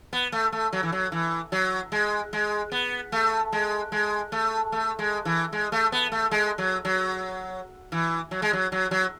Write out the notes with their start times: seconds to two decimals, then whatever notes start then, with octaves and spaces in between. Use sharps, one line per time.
0.13 B3
0.32 A3
0.52 A3
0.73 F#3
0.83 E3
0.92 F#3
1.12 E3
1.52 F#3
1.92 G#3
2.33 G#3
2.72 B3
3.12 A3
3.52 G#3
3.92 G#3
4.32 A3
4.72 A3
4.99 G#3
5.25 E3
5.52 G#3
5.72 A3
5.92 B3
6.12 A3
6.31 G#3
6.58 F#3
6.85 F#3
7.92 E3
8.31 F#3
8.42 G#3
8.53 F#3
8.72 F#3
8.91 F#3